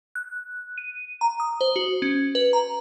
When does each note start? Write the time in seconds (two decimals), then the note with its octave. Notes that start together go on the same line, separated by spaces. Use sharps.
0.15 F#6
0.78 D#7
1.21 A#5
1.40 D#6
1.61 C5
1.76 F#4
2.02 C#4
2.35 B4
2.53 A#5